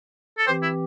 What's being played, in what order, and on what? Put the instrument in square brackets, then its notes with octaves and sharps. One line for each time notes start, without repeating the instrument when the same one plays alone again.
[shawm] A4
[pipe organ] E3 C4 G4 [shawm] C5
[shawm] E4